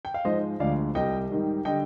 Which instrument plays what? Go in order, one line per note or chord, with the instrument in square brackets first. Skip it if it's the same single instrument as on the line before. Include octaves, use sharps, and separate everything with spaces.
[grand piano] G5
F5
G#2 F3 G#3 C5 D#5
D2 D3 F3 G#3 D5 F5
C2 C3 G3 D#5 G5
G#2 D#3 G3
D3 G3 D#5 G5